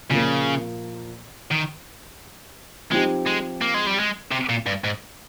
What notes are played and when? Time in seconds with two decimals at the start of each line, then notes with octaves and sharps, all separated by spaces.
0.10 A#2 C#3 F3 A#3
1.51 D#3
2.91 F3 G#3 C4 D#4 G4
3.26 G#3
3.61 A#3
3.74 G#3
3.87 G3
3.99 G#3
4.32 C3
4.49 A#2
4.66 G2
4.84 G#2